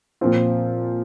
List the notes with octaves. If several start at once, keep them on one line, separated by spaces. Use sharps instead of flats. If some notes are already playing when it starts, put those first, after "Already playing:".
A#2 F3 C4 F4